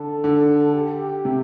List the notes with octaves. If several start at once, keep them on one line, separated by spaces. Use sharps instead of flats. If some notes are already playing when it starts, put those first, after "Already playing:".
Already playing: D3 A4
D3
G4
C3